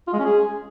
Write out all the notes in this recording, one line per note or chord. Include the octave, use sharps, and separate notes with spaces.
F4
G#3
C#4
G#4